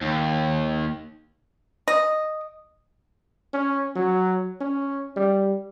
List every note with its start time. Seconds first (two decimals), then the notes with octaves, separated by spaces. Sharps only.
0.01 D#2
1.88 D#5
3.53 C#4
3.95 F#3
4.60 C#4
5.17 G3